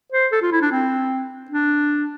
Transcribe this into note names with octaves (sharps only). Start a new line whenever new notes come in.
C5
A4
F4
E4
D4
C4
D4